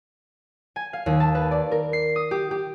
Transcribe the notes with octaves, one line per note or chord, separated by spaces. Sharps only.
G#5
F5
D#2
A5
B4
D5
A#4
C7
D#6
G4
G4